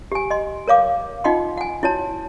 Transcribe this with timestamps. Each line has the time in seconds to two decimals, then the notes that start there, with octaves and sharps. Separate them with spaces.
0.12 G4 G#5
0.31 D#5 C6
0.68 A#4 C#5 F5 D6
1.24 D#4 F4 D#5 F#5 G5 C6
1.58 F#5 G#5
1.83 E4 F#4 C#5 A5